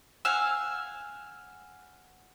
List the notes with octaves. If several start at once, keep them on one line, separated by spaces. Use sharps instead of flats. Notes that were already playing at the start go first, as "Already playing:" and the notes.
F5 F#5 G#5 E6